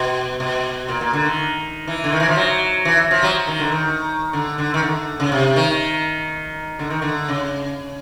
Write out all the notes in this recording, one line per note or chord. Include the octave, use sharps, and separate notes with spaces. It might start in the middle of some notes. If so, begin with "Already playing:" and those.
Already playing: B2
B2
A#2
A#2
D3
D#3
E3
D3
D#3
E3
F3
F#3
E3
F3
F#3
D#3
D3
D#3
D3
D3
D#3
D3
C#3
C3
D#3
D3
D#3
D3
C#3